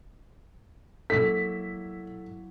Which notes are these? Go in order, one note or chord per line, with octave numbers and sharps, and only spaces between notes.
F#3 A#3 E4 A4 B6